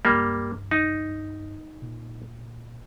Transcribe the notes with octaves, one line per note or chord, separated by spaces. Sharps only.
C#2 G2 G3 A#3
D#4
A#2